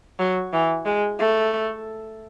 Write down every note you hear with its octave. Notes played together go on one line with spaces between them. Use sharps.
F#3
E3
G#3
A3